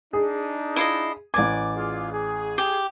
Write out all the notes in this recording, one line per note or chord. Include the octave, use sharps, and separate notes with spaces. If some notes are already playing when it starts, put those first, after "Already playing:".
D4 D#4 G#4
E4 F4 D#5
A1 D5 G#5 D6
F4 G#4
G#4
G4